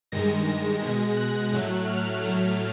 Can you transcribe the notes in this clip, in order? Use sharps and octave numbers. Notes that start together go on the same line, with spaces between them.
G2 D#3 G#3 A#6
A#6
B2 G#3
F#6
A2 F#3 A3
F6
A2 F#3 A3